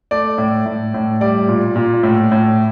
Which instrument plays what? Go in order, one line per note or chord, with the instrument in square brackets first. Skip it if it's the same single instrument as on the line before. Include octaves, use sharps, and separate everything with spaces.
[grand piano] A3 D5
A2
A2
A2
G3 D5
A#2
A#2
A2
A2